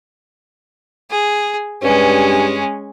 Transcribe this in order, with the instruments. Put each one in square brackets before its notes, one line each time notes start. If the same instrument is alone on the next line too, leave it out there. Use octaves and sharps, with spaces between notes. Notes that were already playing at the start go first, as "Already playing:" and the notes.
[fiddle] G#4
[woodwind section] G2 [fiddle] G#3 C#4